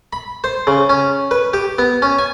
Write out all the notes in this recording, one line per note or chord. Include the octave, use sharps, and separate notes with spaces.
B5
C5
C#3
C#4
B4
G4
B3
C#4
G#5